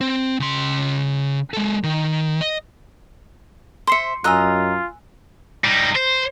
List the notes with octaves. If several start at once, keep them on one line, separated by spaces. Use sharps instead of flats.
C4
C#3 C6
G#3 A4
D#3
D#5
C5 E5 C6 C7 C#7
F#2 F4 D#5 G#5 A#5 E6 F#6
G3 D#4
C5